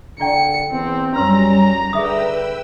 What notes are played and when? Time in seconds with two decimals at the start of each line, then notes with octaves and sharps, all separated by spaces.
0.20 D3 E4 D5 G5 C#7
0.71 E2 C4
1.16 F#2 G3 C#4 B4 A#5 C6 E6
1.93 D3 G#4 B4 E5 G5 D#6 E6